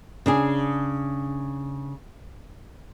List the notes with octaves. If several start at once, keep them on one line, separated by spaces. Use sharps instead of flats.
C#3 D4 G#4